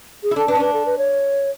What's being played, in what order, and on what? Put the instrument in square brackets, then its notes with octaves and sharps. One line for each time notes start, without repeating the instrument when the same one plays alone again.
[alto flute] G#4
[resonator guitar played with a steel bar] E4
[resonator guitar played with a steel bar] D4 [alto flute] A4
[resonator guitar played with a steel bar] D4 [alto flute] B4
[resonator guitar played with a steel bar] C#4
[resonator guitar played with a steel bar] D4 [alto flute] B4
[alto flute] A4
B4
C#5